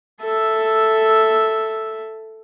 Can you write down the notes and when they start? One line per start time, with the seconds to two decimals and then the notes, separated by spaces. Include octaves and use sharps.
0.22 A4 E5